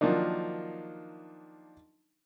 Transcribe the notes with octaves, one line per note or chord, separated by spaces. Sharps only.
D#3 F3 F#3 A#3 D4 D#4